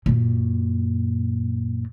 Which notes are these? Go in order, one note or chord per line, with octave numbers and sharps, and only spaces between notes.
F#2 A#2